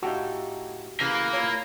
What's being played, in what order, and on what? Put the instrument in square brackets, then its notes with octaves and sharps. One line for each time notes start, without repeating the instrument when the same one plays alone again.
[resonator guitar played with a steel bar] A2 D#4 [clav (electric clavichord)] F#4 G4 F5
[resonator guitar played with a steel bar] C#3 E3 G#4 [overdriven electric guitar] A#3 A#4
[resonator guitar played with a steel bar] E4 F4 C#5